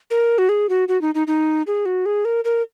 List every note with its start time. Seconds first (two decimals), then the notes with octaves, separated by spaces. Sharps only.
0.11 A#4
0.38 F#4
0.49 G#4
0.69 F#4
0.88 F#4
1.02 D#4
1.15 D#4
1.27 D#4
1.67 G#4
1.86 F#4
2.06 G#4
2.25 A#4
2.45 A#4